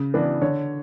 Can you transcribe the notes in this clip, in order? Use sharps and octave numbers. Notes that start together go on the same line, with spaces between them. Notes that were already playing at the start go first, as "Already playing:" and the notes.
Already playing: C#3
E3 B3 D4
D3 C#5